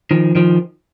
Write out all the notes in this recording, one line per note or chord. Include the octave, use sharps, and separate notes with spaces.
D#3 F3
D#3 F3